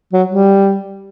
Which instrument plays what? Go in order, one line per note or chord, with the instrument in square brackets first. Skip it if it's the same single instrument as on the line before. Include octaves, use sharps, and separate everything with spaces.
[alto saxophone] F#3
G3